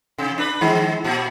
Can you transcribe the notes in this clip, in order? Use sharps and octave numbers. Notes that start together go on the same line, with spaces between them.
C3
D4 B4
D#3 G#3
A#2